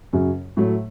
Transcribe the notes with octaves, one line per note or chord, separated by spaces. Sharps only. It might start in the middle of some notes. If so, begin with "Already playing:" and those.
F#2 C#3 F#3
A2 F#3 A3